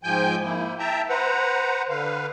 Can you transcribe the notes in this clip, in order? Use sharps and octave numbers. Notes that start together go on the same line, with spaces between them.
G#2 F3 G5 G#5 G6
A#3 E4
E5 G5 A5 A#5
B4 C5 F#5 A#5
D3 B4 F5